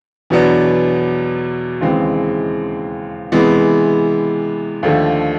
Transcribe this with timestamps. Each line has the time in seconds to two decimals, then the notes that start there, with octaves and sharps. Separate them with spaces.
0.30 E2 B2 F#3 B3 D4
1.81 D#2 C#3 E3 G#3 C4
3.32 C3 E3 G#3 B3
4.83 D#2 D3 F3 A3